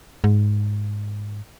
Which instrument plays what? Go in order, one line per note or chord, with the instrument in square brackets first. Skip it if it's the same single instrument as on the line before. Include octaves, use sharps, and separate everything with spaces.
[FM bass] G#2